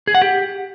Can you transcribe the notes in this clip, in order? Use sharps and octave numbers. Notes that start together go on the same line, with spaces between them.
G#4
F#5
G4